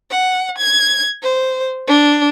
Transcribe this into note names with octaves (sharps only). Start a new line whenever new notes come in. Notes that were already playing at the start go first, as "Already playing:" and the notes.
F#5
G#6
C5
D4